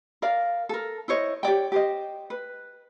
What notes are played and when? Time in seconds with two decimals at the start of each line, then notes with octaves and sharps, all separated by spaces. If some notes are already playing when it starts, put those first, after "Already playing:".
0.22 A#4 D5 F5
0.69 A4 A#4
1.08 E4 C5 C#5 D#5
1.43 G4 C#5 D5 G5
1.72 G4 C5 D#5
2.30 B4